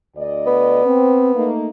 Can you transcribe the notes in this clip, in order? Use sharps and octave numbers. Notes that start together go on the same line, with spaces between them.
D2 D5 D#5
B3
C4
A3 A#3 D#4